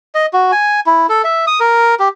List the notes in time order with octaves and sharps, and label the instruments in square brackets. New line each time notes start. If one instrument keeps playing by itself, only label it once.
[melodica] D#5
F#4
G#5
E4
A4
E5
D#6
A#4
G4